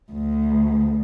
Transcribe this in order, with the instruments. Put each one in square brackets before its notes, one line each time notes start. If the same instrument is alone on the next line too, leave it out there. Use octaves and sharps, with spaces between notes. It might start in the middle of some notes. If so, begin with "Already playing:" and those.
[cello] D2